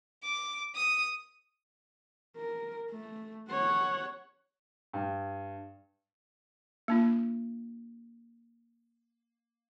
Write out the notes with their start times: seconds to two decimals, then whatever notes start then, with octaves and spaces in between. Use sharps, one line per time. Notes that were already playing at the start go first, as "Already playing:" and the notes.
0.24 D6
0.75 D#6
2.37 A#4
2.91 A3
3.51 C#5 F#5
4.93 G2
6.88 A#3 D4 F4